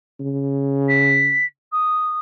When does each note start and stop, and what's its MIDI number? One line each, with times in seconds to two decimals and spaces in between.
0.20 1.41 49
0.88 1.45 95
1.72 2.20 87